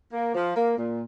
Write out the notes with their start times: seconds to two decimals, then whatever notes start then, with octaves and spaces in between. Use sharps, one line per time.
0.13 A#3
0.34 F3
0.55 A#3
0.77 A#2